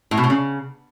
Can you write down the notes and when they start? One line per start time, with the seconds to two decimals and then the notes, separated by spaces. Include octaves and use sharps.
0.11 A2
0.17 B2
0.24 A2
0.30 C#3